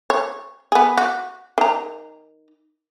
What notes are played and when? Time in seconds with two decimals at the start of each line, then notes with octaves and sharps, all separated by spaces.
0.10 C#5
0.72 B3 G#4
0.97 F#4
1.58 D#3 A#5